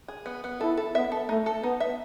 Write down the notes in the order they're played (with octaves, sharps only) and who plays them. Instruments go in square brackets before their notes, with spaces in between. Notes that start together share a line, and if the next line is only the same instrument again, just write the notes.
[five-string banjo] G#4
B3
B3
[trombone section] E4 [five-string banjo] A4
[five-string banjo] A4
[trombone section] B3 [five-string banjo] E5
[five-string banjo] A4
[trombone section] A3 [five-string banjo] D#4
[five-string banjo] A4
[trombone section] B3 [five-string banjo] D#4
[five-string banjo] E5